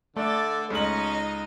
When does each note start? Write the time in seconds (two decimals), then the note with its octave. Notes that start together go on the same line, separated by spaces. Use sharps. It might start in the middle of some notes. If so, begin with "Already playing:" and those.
0.17 D3 A3 A4 D5
0.70 C#2 C#4 D#4 D#5 F#7